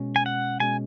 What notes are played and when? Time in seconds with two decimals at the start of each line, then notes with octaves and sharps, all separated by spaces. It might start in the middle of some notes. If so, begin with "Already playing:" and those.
Already playing: B2 G#3 C#4
0.16 G#5
0.26 F#5
0.60 B2 G#3 C#4 G#5